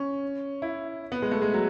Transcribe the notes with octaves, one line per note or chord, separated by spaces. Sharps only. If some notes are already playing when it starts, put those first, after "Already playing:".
Already playing: C#4
E4
B3
G#3
A3
G#3
F#3